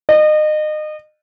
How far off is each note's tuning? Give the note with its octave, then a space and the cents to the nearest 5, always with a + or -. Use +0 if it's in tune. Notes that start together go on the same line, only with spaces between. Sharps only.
D#5 -30